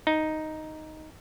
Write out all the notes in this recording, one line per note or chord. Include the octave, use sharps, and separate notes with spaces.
D#4